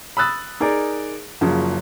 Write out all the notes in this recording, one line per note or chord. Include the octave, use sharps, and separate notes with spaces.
B5 D#6 E6 F#6 A6
D#4 G#4 A#4 D5
F#1 C#3 F3 F#3